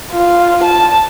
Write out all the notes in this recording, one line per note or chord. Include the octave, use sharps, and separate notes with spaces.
F4
A5